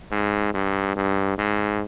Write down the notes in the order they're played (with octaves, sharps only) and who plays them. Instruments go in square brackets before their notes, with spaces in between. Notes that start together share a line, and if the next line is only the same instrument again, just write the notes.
[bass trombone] G#2
G2
G2
G#2